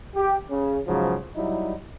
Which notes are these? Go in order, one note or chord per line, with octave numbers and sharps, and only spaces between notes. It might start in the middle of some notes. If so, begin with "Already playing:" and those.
G4
C#3
G#2 C#3 F3 F#3
F#3 G3 D#4 E4